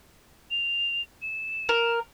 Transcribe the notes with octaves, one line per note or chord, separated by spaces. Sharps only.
F7
E7
A#4